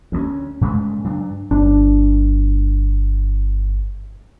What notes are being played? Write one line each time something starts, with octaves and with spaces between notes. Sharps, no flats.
D2 G#3 C#4
G2 C#3 G#3 A3
G2 F#3 D4
G1 D4